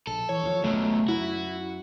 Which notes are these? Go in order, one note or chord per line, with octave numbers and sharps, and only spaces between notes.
A#1 A4
E3 C#5
D#2 D#3 F3
G#1 C#2 F#2 B2 A3
F#2 E4 F#4